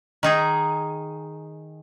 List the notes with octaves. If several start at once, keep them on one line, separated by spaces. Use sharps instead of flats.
D#3 D#4 G#4